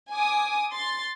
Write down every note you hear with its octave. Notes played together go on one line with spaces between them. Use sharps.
G#5 D6 D#6
C6 A6